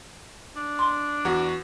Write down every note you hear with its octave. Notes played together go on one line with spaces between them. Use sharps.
D4
C6
E2 F#4